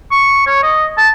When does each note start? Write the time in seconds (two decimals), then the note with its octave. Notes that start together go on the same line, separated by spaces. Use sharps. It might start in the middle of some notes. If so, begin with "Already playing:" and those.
0.11 C#6
0.47 C#5
0.63 D#5
0.97 A5